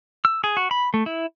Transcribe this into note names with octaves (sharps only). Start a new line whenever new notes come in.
E6
G#4
F#4
B5
A3
E4